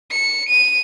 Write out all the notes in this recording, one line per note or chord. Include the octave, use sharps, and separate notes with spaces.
C#7
D#7